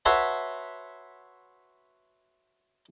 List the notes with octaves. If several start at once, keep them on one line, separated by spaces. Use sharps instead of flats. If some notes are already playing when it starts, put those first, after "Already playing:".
F#4 B4 C#5 E5 A5 C6